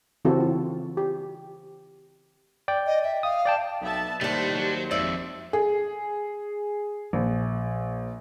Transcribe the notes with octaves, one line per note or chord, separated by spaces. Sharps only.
C#3 E3 C4 F#4 G4 A4
F4
G4
D5 G5
D#5
E5
F5 D#6
D5 G5 A5
B1 B3 E5 A5
D#2 A2 G3 A3 D4 C5
F#3
G#1 F2 D5 E5
G#4
A#1